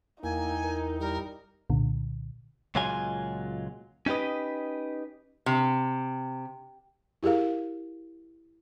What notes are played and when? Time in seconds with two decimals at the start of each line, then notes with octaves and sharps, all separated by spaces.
0.23 E2 A#3 D#4 E4 G5 G#5
0.64 A#4
1.00 G3 A#4
1.70 C2 A#2 D3
2.75 C#2 A#2 F#3 G#3 F4 G#5
4.06 C#4 D#4 G4 B4 D#5
5.46 C3
7.23 E4 G4 G#4 A#4 F5